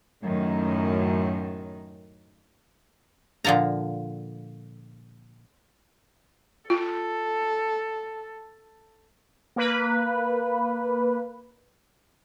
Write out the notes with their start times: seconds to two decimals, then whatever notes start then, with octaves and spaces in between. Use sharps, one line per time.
0.23 F#2 A2 D#3
3.45 A#2 D3 F3 A5 A#5
6.70 F4 A4
9.56 A#3 B4